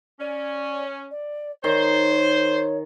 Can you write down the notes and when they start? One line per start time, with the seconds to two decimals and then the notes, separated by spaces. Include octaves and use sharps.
0.20 C#4 D5
1.11 D5
1.64 D#3 C5 C#5